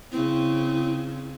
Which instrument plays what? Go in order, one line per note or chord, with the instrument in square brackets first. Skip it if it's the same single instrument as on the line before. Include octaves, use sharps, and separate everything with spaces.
[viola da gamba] C#3 C4 [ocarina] E4